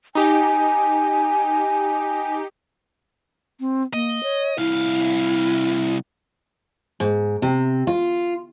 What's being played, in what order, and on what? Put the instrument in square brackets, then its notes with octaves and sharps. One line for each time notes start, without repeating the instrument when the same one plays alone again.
[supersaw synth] D#4 G4 [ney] G#5
[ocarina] C4
[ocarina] A#3 [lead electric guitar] D#5
[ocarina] C#5
[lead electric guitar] C2 F5 [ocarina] E4
[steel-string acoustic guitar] G#2
C3
F4